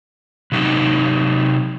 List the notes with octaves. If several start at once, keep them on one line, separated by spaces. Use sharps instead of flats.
C3 F#3 D#4 G4